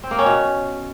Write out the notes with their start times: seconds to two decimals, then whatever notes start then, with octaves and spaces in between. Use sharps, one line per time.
0.03 C4
0.11 A#3
0.19 C#4
0.26 B2